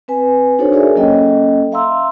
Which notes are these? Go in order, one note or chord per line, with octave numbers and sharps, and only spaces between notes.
C4 B4 G#5
D4 D#4 F#4 A4 C5 C#5
G#4 A#4 C#5 D5 E5 G#5
F#3 A#3 C#4 A4 D#5 G5
E5 F5 A#5 C6 E6